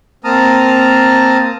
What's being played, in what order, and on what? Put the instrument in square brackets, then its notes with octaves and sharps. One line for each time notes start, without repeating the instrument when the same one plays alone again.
[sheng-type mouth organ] A#3 C4 A5 A#5 D#6 F6